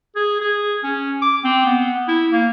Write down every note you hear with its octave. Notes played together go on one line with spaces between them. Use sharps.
G#4
G#4
C#4
D6
C4
B3
E4
A#3